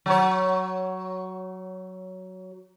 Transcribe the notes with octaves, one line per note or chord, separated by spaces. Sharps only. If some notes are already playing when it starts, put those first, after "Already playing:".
F#3 C#5